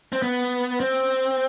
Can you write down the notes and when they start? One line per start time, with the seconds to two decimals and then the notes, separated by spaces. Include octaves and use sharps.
0.13 C4
0.22 B3
0.80 C4